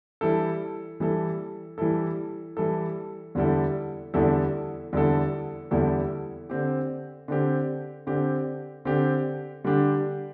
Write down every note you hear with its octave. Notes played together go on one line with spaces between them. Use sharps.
E3 G3 E4 A4
E3 G3 E4 A4
E3 G3 E4 A4
E3 G3 E4 A4
E2 D3 G3 E4 A4
E2 D3 G3 E4 A4
E2 D3 G3 E4 A4
E2 D3 G3 E4 A4
D3 C4 G4
D3 C4 G4
D3 C4 G4
D3 C4 G4
D3 G3 D4 G4